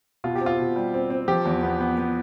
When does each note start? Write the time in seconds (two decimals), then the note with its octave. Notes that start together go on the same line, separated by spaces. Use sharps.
0.24 B2 F4
0.35 G4
0.41 C4
0.46 F4
0.59 B2
0.76 G3
0.94 C4
1.10 C4
1.28 F3 G4
1.46 E2
1.63 B3
1.80 B3
1.98 B3